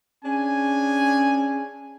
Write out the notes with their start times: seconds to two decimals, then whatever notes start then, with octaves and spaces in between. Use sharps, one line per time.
0.24 C#4 D4 G#4 G#5